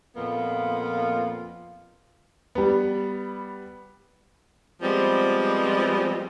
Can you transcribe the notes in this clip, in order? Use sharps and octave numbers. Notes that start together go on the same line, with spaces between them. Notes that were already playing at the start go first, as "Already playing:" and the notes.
F2 A#2 A#3 B3 F4
G3 B3
F3 G3 G#3 B3 C4